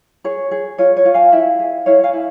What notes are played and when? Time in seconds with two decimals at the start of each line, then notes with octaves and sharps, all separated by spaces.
0.24 G#4 C#5
0.51 G#4
0.78 F4 C#5
0.97 C#5
1.05 F4
1.14 F5 G#5
1.32 E4 E5 G5
1.59 G#4
1.86 E4 C#5 F5
2.04 F5 G#5
2.13 E4